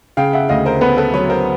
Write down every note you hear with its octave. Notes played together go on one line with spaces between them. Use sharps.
C#3 F5 G5
E5 F#5
D2 D#5 F5
A#4 C5
B3 A4 B4
A4 B4
F#3 B4 C#5
A#4 C5